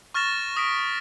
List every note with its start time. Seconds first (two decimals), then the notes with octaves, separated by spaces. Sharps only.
0.14 C#6 F6 A6 A#6 E7
0.56 D#6 A#6 B6 D7